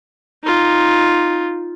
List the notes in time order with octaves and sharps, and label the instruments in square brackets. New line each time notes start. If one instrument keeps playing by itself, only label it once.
[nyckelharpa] D#4 F4